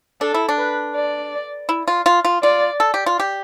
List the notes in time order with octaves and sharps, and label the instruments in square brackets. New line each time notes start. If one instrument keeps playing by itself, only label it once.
[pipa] D4 [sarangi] A4
[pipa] E4
D4
[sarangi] B4
D5
[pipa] E4
F4
F4
F4
[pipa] F4 [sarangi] D5
[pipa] A4
G4
F4
G4